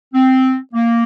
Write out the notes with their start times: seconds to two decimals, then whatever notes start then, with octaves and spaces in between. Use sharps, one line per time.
0.14 C4
0.74 A#3